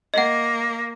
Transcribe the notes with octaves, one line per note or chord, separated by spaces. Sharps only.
A#3 D#5 F#5